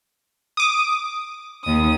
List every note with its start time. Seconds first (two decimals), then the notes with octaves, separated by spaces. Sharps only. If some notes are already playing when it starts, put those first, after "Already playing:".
0.57 D6 D#6
1.63 D#2 D#6